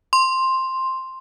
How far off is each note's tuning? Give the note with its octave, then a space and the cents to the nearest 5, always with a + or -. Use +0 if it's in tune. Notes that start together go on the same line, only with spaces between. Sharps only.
C6 +5